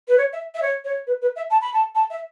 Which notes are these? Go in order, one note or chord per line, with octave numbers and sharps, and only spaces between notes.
B4
C#5
E5
E5
C#5
C#5
B4
B4
E5
A5
B5
A5
A5
E5